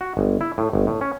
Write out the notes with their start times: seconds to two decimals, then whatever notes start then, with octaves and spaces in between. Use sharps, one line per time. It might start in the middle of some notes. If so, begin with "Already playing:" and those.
0.01 F#4
0.17 G1
0.41 E4
0.58 A2
0.73 G1
0.87 A2
1.01 C#4